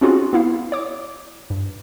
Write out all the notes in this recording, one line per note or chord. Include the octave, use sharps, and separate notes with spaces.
C4 C#4 D#4 F4 F#4 G#4
B3 E4 F5
C#5 D6
G2